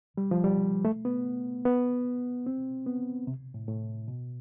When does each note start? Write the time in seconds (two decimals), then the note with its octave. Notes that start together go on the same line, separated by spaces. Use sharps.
0.17 G3
0.31 F3
0.44 G3
0.85 A3
1.05 B3
1.65 B3
2.46 C4
2.86 B3
3.27 C3
3.54 A2
3.68 A2
4.08 B2